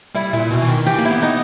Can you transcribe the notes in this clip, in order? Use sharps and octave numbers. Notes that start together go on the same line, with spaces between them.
G3 E4
A#2 E4
B2
E3
D#3
E3 G4
A#3
E4
B3
D#4